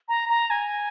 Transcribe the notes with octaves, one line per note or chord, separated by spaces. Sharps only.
A#5
A#5
G#5